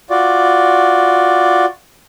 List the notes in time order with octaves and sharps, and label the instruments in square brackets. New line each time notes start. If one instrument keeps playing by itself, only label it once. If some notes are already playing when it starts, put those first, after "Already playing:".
[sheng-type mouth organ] F4 F#4 D5